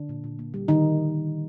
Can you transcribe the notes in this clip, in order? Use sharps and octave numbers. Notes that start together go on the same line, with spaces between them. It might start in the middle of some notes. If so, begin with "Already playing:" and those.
Already playing: D3 D4
A#2
A#2
A#3
G3
D3 D#3 D#4